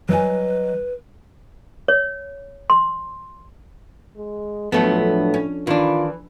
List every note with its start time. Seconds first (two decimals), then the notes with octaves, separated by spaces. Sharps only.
0.09 F#3 B4 D#5 G#5
1.88 C#5
2.70 C6
4.17 G#3
4.72 A2 F3 F#3 A3 B3 D4 A4
5.34 C#4
5.67 D#3 E3 D4 F4